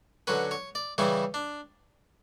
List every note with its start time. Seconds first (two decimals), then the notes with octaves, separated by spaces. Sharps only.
0.27 D3 F#3 C#4 B4
0.51 C#5
0.75 D5
0.98 C#3 E3 G3 C#4 E4
1.34 D4